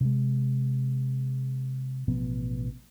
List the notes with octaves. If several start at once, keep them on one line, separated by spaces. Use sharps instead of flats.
C3 G#3
A1 B2 F3 B3